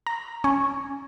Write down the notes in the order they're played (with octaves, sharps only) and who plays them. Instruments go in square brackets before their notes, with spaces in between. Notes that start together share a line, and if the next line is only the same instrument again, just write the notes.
[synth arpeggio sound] A#5
C#4